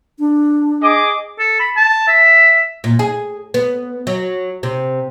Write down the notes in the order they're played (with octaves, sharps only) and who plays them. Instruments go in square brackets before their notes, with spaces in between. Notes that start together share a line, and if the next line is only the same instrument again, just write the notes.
[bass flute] D4
[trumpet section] G#4 D#5 D6
[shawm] A4
B5
A5
E5
[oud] A#2
G#4
B3
F#3
C3